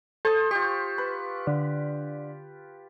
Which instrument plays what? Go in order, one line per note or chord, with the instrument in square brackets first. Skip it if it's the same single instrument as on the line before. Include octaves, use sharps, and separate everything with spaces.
[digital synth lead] A4 [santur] C5 D#6
[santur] F4 G4 [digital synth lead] C#6
[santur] B4
[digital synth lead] D3